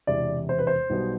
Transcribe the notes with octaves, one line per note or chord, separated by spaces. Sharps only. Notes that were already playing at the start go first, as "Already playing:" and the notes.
E1 E2 C3 D5
C5
B4
C5
B1 B2 G3 B3